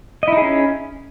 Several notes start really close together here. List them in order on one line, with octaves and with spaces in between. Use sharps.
D#5 E4 D#4 G#4 C#4